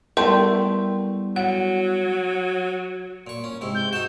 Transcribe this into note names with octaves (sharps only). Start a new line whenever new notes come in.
G3 A3 B3 E4 A#4 G5 C6
F#3 F#5
A#2 C#6
C#4
G#2 C3 E4
G6
D#4 F#4 E7